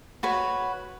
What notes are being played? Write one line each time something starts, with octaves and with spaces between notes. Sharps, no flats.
F#4 B4 C#5